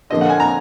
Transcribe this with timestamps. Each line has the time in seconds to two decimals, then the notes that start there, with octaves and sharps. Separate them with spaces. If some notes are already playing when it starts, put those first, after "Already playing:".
0.10 D3 F3 A#3 D#5
0.21 F#5
0.30 G#5
0.40 A#5